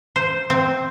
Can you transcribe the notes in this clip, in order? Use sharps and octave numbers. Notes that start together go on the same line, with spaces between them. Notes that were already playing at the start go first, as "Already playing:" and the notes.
C5
C4